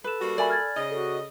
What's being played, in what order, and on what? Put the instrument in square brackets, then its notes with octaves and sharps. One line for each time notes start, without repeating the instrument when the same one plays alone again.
[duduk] A4 [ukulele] B4 [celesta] B5 E7
[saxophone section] G3 A#3 F#4
[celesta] A#4 E5 [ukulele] D5 G#5 B5
[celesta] F6 G#6 A6
[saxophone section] C#3 D#5
[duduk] F#4 [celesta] A4